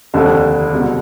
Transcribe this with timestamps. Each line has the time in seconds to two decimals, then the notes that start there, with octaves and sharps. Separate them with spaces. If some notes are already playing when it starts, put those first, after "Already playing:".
0.14 F1 D#2 D3
0.72 C2 B2 G#3